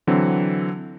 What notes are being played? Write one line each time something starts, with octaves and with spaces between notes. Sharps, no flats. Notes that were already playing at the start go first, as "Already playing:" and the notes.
D3 E3 F#3 C4